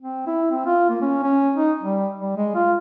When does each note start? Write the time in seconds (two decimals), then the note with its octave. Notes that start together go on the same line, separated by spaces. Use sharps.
0.02 C4
0.27 E4
0.51 C4
0.66 F4
0.89 A#3
1.02 C#4
1.23 C#4
1.56 D#4
1.83 G3
2.20 G3
2.37 G#3
2.55 F4